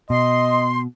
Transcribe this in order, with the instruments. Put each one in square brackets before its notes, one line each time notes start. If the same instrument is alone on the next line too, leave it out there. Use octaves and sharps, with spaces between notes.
[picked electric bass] B2 [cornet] D#5 [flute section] C6